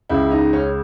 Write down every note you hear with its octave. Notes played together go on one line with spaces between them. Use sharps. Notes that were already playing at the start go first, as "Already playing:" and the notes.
C#2 C#3 G#3 E4
D#4
C#4